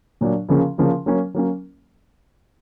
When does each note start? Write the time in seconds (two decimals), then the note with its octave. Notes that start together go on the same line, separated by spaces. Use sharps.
0.21 A#2 F#3 A#3 D4
0.49 C#3 F3 A#3 C#4
0.78 C#3 F3 A#3 C#4
1.06 F#3 A#3 C#4
1.34 F#3 A#3 C#4